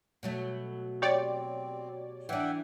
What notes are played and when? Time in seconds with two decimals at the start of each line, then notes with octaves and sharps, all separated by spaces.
0.23 B2 F#3 A3
1.02 C4 G4 C#5 D5
2.29 E3 D4 E5 F#5 G5